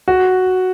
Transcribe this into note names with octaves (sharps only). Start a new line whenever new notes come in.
F#4